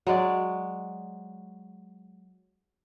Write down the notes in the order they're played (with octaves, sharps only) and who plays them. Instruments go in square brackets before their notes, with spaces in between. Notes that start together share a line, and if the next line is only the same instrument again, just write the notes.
[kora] F#3 G#3 D5